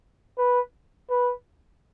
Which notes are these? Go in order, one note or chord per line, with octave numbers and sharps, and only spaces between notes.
B4
B4